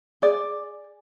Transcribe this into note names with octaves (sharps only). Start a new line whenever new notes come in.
G#4 D5